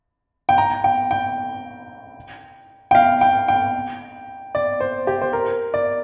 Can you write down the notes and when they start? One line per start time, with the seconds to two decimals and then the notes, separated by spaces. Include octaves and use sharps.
0.49 G5
0.58 A#5
0.84 G5
1.11 G5
2.91 G5
2.95 F5
3.21 G5
3.48 G5
4.55 D5
4.80 C5
5.07 G4
5.21 C5
5.33 A#4
5.74 D5